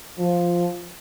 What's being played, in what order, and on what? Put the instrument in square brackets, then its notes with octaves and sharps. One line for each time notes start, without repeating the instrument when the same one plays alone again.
[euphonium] F3